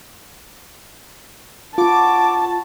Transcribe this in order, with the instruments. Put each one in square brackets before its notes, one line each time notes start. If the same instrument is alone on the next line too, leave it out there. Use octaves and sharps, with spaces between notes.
[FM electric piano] F4 [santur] F#4 B4 [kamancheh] A5 [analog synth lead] D6